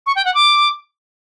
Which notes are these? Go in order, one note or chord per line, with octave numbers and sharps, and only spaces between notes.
C#6
G5
F#5
D6